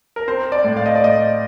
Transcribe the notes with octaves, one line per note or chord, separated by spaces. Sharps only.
A#4
C4 C5
D5
A2
F5
D#5
D5
A2 D#5